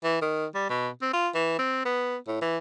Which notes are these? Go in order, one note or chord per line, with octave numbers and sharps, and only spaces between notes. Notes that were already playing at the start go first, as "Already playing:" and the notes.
E3
D#3
G3
B2
C4
F4
E3
C4
B3
A2
E3